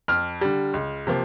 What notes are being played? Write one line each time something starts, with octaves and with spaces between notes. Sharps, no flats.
F2 F6
D3 G3
C#2
C3 F3 A#3